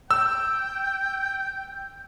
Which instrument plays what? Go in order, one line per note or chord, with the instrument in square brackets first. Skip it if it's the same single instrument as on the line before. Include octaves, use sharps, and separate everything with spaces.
[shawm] G5 [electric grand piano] E6